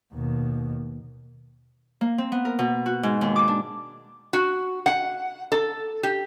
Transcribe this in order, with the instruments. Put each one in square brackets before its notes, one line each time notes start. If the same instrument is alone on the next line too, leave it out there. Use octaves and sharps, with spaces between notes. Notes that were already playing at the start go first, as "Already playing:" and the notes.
[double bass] D#2 B2
[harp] A#3
C4
B3
A#4
B2
F#4
G#2
D#2
D6
D4
[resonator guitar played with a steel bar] F#4
F#5
A4
G4